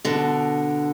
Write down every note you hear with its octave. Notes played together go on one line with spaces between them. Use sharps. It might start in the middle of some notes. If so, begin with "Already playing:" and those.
B2 D3